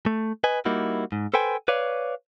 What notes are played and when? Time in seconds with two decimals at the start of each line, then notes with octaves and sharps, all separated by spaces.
0.06 A3
0.44 B4 D#5 G#5
0.65 G3 A#3 D#4 E4 F#4
1.12 G#2
1.34 A4 B4 C5 G5 G#5
1.68 B4 C#5 D5 F5